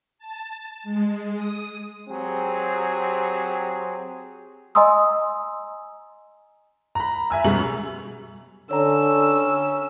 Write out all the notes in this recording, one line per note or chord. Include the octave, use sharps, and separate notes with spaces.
A5
G#3
D#6
F#3 C4 G4 G#4
D#5 G#5 A#5 C6 D#6 E6
A#5 B5
E5 G#5 E6
F#2 B2 G3 G#3 F#7
D3 C#4 C#5 A#5 E6